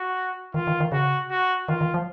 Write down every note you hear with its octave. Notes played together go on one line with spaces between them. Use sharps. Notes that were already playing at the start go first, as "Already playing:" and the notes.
Already playing: F#4
D#3 F4
D#3
D#3
C#3 F#4
F#4
D#3 F4
D#3
F3